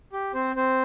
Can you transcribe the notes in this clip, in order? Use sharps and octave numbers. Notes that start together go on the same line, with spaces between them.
G4
C4 C5
C4 C5